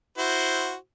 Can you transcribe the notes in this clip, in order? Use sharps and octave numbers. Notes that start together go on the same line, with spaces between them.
E4 F#4 C5